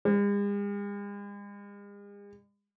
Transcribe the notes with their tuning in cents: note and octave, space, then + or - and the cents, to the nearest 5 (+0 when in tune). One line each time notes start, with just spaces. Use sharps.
G#3 -45